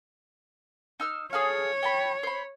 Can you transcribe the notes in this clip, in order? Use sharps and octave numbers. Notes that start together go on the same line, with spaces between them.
D#4 E6 F6
G#4 A4 C#5 F5
G5 A5 B5
C5 B5